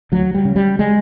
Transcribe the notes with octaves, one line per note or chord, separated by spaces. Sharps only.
D2 F#3
G3
C#3
G3
G#3